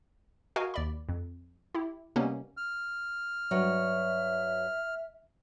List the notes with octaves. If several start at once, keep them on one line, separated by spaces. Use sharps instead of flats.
F#4 A#4 D#5 F5 G#5
D#2 D5 B5
F2
E4 G4
C3 G3 A#3 B3 C#4 D#4
F6
G2 F#3 C#5 E5